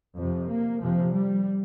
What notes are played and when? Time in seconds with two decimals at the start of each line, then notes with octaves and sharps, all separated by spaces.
0.16 F2 C3 F3
0.48 A#3
0.80 F2 C3 F3
1.12 G3